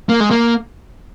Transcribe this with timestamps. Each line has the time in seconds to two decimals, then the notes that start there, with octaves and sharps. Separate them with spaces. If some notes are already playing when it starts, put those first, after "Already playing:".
0.09 A#3
0.20 G#3
0.31 A#3